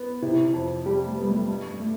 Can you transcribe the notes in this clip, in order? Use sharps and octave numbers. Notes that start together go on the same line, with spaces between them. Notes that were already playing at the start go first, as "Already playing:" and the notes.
Already playing: B3
C3 E4
F2
G3 G4
A3
B3
G3
A3
G2
A3